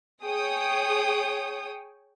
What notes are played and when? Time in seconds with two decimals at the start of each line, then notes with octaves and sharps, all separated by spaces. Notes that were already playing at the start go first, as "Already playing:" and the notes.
0.24 G#4 C#5 G5 D#6